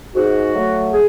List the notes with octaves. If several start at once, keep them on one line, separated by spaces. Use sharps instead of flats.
G#2 F#4
F#3 A3
G#4